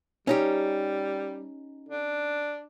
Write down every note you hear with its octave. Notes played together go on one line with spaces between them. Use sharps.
G3 C#4 D#4 G4
D4